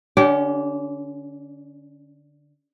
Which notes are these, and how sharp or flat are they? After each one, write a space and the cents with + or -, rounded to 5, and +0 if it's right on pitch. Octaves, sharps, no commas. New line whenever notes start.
D3 +0 C#4 +30 G4 -20